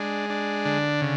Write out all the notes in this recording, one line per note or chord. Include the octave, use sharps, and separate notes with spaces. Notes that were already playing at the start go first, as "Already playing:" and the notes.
Already playing: G#3 D4
D4
D3
C#3